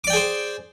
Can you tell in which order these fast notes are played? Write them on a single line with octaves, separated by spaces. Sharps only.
D6 D5 G5 G#4 C5